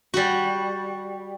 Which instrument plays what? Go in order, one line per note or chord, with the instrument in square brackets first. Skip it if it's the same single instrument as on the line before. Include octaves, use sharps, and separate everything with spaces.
[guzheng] G3 F#4